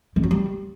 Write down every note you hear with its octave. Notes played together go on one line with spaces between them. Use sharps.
G#3
F#3
G3